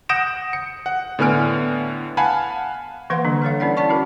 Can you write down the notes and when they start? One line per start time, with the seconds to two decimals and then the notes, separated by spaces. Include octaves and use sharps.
0.09 F#5 D#6 G6 A#6 D7 E7
0.53 C#7
0.86 F#5
1.19 A2 D3 B3 G#5 F6 D7
2.17 F5 F#5 G#5 A5 B5
3.10 E3 A#3 B4 F5 F#5 C6
3.25 D3 G3 D4
3.42 A4 B4 C#5 F5
3.60 C#4 E4 D5 F#5
3.77 D5 A5 C#6
3.89 E4 F#4 A#4